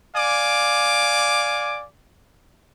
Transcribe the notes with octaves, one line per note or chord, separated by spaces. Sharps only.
D5 F5 G#5 D6